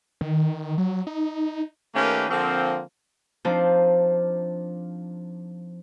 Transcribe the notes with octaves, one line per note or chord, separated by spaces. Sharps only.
D#3
F#3
D#4
D#3 A3 A#3 C#4 G4 B4
D3 F3 A#3 C4
F3 C4 D4 D#4 C5